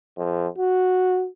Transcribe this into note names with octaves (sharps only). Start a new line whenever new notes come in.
F2
F#4